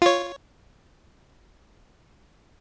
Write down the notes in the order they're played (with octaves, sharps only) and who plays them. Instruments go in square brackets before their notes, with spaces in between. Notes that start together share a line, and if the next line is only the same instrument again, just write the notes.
[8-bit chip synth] F4 C#5